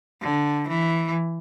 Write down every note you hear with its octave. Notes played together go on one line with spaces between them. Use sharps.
D3
E3